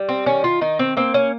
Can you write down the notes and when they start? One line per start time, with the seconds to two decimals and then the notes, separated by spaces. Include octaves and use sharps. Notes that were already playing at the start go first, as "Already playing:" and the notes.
Already playing: G3
0.09 C4
0.26 D#3 C#4
0.44 F4
0.61 D#3 D#4
0.79 C4
0.97 A#3 C4
1.14 C#4